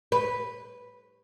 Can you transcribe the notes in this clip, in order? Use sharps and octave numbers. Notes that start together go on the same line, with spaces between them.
B4